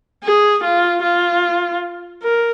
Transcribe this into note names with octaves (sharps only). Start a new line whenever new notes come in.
G#4
F4
F4
A#4